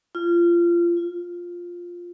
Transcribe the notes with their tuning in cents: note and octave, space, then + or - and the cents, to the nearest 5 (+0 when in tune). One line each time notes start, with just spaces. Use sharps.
F4 -25
F4 +5